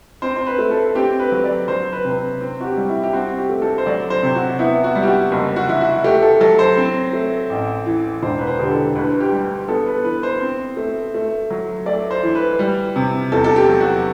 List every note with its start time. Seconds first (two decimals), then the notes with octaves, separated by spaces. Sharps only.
0.22 C4 C5
0.36 C5
0.47 B4
0.58 A3
0.71 A4
0.95 C4 G4
1.20 B4
1.32 F#3
1.44 D5
1.68 F#3 C5
1.93 B4
2.05 C3
2.41 C4
2.60 F#4
2.65 G4
2.77 G3
2.89 E4
3.03 G4
3.13 C4 F#4
3.38 G4
3.49 A3
3.62 A4
3.78 C5
3.86 F#3 D5
4.10 C5
4.23 C3
4.35 F#4
4.59 B3 E4
4.84 F#4
4.95 G3
5.03 G4
5.07 F#4
5.32 F#1
5.56 F#4
5.68 E3 E4
5.81 F#4
6.04 A3 G4
6.22 A4
6.41 F#3 A4
6.59 C5
6.77 C4
7.13 A3
7.50 A1
7.86 E3
8.23 E1 C5
8.39 B4
8.47 C5
8.59 D3 G4
8.71 A4
8.95 D2 B4
9.20 G4
9.32 G3
9.68 B3 A4
9.86 B4
10.05 E3 B4
10.23 C5
10.41 C4
10.77 A3
11.14 A3
11.50 F#3
11.86 A3 D5
12.11 C5
12.23 E3
12.35 B4
12.59 G3
12.96 C3
13.32 E2 A4
13.44 A4
13.56 G4
13.68 F#3
13.80 F#4